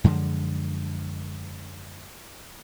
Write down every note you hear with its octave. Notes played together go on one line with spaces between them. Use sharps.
F#2 D3 F3 G#3